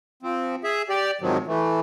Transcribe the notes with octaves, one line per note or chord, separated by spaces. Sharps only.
F3 C4
G#4 E5
G4 D5
G#2 C3 D#3 F3 F#3
E3 A3